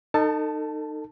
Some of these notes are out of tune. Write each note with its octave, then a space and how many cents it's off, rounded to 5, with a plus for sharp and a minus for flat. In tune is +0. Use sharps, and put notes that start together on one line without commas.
D#4 -20 A4 +30 A5 +0